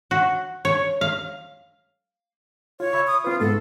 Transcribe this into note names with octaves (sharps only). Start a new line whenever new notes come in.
F#4
C#5
F5
F4 C#5
E5 B5 C#6
D#6
C4 F4 B4
G#2 A3 B3 A4